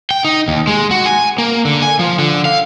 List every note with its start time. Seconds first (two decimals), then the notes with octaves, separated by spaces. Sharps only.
0.11 G5
0.25 D#4
0.48 D#2
0.67 G#3
0.91 F#4
1.06 G#5
1.38 A#3
1.65 D3
1.82 G#5
1.99 F3
2.19 D3
2.45 F5